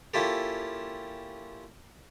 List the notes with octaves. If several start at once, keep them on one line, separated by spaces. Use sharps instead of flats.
A#3 C#4 E4 F4 G4 A4